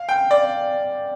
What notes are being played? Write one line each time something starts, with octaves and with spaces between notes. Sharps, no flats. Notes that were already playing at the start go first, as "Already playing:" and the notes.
Already playing: F5
G5
D5